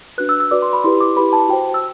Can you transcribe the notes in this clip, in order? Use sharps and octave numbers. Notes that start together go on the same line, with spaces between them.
D4 F#4 B4 F#6
E6
E6
F#4 B4 D5 D6
C6
B5
E4 G4 B4 C6
D6
E4 G4 B4 B5
A5
F#4 C5 G5
E6